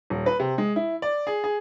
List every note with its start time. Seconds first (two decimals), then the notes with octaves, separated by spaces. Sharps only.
0.10 D#1
0.26 B4
0.40 C3
0.58 G#3
0.76 E4
1.02 D5
1.27 G#4
1.44 G#4